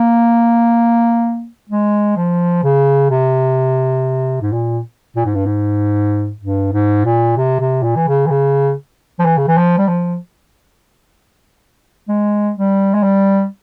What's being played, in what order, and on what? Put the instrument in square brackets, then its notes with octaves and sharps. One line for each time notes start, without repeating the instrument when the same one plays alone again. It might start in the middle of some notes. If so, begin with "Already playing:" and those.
Already playing: [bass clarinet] A#3
G#3
F3
C#3
C3
G#2
A#2
A#2
G#2
G2
G#2
G2
G#2
A#2
C3
C3
A#2
E3
C#3
E3
C#3
F3
E3
C#3
E3
F3
G3
F3
G#3
G3
G#3
G3